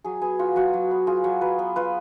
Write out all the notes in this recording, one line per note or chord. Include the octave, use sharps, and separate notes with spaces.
F#3 G#4
B3 G#4
F4 F#4
F#3 F#4
F#3
B3
F4 G#4
F#3
F#3 B4
B3
F4 B4